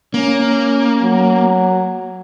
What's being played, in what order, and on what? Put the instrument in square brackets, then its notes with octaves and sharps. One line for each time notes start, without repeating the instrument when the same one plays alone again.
[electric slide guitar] A#3 [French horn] C#4
[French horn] F#3